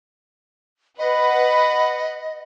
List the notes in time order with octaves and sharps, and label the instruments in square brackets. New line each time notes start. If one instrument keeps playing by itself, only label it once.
[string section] B4 F#5 B5 [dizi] D#5